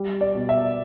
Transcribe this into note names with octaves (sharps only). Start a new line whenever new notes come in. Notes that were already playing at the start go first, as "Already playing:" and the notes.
Already playing: G3
D5
B2
E5